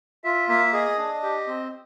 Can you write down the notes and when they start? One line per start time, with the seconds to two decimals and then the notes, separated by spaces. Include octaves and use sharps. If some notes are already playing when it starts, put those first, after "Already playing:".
0.24 F4 E5
0.48 A#3 E5
0.73 G#4 D#5
0.98 D4
1.23 G4
1.47 C4